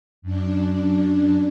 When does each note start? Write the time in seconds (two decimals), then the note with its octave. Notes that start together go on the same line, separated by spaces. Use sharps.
0.22 F#2 D4